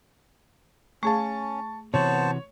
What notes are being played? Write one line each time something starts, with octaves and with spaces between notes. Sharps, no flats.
A3 C#4 G#4 F5 A5 C#6
C3 E3 B3 F#4 C5 C#5 A5